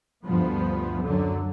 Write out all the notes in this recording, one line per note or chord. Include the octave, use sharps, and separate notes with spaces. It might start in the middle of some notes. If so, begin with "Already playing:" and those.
D2 G2 F3 B3
F#2 D3 F#3